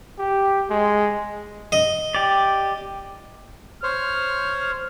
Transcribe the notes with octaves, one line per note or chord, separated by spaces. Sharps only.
G4
G#3
D#5
G4 D5
C5 C#5 F6